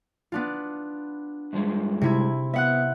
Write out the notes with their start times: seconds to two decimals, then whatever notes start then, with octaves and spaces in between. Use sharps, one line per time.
0.32 B3 D4 F4
1.53 G2 F3 G#3
2.01 C3 E4 G#6
2.54 B3 E5 F#5 F#6